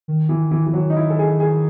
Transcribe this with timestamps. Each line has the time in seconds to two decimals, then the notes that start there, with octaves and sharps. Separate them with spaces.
0.08 D#3
0.29 E3
0.51 E3
0.66 E3
0.73 F#3
0.90 D#4
0.97 E4
1.10 A4
1.19 G#4
1.40 G#4